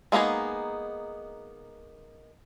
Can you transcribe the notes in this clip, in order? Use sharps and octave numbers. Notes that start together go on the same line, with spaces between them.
G#3 A#3 B3 D#4 G#4